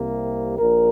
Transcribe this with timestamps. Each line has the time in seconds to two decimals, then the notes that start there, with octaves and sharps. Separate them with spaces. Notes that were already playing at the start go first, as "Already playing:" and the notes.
Already playing: C2 C3 A#3
0.59 A#1 A#2 A#4